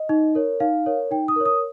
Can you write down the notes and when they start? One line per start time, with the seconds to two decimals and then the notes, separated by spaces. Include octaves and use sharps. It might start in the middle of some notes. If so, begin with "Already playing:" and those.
Already playing: D#5
0.09 D#4
0.35 A#4 C#5
0.60 D#4 F5
0.86 A#4 C#5
1.11 D#4 G5
1.28 D#6
1.36 A#4 C#5
1.45 D#6